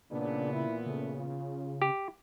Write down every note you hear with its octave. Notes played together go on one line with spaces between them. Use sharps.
A#2 C#3 E3 B3 D4
E4
C#3 A3
F4
G4